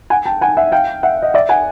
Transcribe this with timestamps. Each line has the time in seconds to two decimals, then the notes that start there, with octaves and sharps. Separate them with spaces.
0.10 F#5 G#5
0.25 G5 A5
0.41 F#5 G#5
0.57 E5 F#5
0.72 F5 G5
1.03 E5 F#5
1.22 D#5
1.34 D5 E5
1.49 F#5 G#5